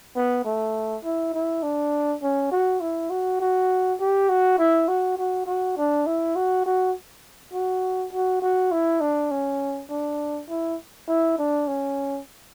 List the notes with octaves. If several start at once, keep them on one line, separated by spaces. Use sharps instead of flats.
B3
A3
E4
E4
D4
C#4
F#4
E4
F#4
F#4
G4
F#4
E4
F#4
F#4
F#4
D4
E4
F#4
F#4
F#4
F#4
F#4
E4
D4
C#4
D4
E4
E4
D4
C#4